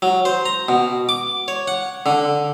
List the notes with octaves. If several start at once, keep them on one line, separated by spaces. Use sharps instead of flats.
F#3
C5
A#5
B2
D6
C#5
F#5
D3